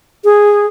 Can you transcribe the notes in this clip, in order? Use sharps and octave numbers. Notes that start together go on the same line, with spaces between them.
G#4